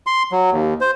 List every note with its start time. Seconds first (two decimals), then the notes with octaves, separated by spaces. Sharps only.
0.07 C6
0.32 F#3
0.51 D#2
0.81 C5